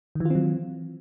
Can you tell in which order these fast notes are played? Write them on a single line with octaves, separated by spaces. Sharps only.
D#3 E3 F4 C4 F#3